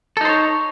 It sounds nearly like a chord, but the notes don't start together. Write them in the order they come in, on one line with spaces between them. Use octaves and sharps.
A4 D#4 C5 C#5